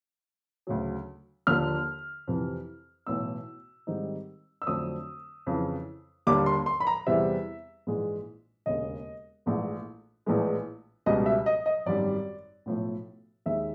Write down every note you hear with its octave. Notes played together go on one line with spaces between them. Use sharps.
D2 C#3 F#3
D#2 D3 F3 A#3 F6
F2 C3 E3
B1 A2 E3 E6
G#2 D#3 G3 C4 D#4
E6
F2 D3 F#3 A3 C4 D#6
F2 C#3 E3
D#2 D3 G3 A#3 D4 D6
C6
C6
B5
A#5
E2 C3 E3 G3 C4 E5
A#1 G#2 E3 G#3
E1 D#2 C#3 D#5
A#1 G#2 E3 A3
A#1 A2 E3 G#3 B3
C#2 B2 G3 D#5
E5
D#5
D#5
G#1 F#2 D#3 G3 D5
B1 A2 F3 A3
D#2 D#3 G#3 E5